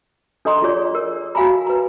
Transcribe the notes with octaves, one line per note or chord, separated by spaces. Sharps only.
D4 A4 D#5 A#5 C6
F4 G#4 C#5 D5
A#4
F#4 F5 G#5 A#5 B5
B4 A#5